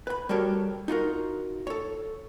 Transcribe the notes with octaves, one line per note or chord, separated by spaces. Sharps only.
B4 B5
G3 F#4 G4 A4 A#4 C#5
D#4 F4 F#4 A#4
A4 C#5